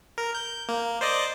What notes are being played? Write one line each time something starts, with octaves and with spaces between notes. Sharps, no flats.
A#4
G6
A#3
C5 D5 D#5